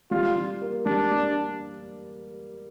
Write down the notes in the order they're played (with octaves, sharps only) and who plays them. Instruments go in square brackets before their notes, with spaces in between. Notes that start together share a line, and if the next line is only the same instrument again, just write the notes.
[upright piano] G3 [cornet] F4
[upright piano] G3
A#3
[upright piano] G3 [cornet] D4
[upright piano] G3